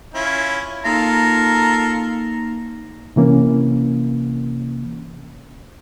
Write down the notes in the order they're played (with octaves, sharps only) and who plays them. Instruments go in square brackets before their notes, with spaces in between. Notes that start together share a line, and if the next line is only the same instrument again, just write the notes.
[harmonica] C#4 E4 F4
[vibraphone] A#3 D#4 [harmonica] F4 A4 A#4 [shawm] A#5
[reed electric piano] C3 E3 A#3 C#4